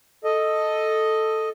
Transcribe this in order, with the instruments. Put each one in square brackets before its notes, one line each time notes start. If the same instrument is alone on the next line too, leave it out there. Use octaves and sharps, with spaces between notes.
[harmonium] A4 D#5